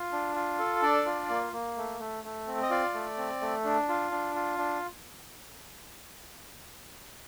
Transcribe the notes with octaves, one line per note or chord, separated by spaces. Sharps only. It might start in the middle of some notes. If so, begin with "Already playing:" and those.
Already playing: F4
D4
F4
A4
D4 D5
F4
A#3
A#3
A3
A3
A3
C4
D#5
F4 D5
A3
C4
A3
D4
F4
D4
F4
D4